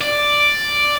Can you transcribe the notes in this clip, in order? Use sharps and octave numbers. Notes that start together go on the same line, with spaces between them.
D5